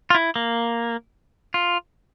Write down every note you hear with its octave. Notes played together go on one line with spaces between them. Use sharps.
F4
E4
A#3
F4